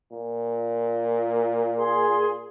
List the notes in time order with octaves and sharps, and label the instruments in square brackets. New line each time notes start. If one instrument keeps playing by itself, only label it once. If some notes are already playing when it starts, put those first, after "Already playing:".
[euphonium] A#2
[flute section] G#4 C6